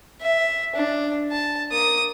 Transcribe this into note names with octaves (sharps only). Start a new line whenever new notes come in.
E5
D4
A5
A#3 D#6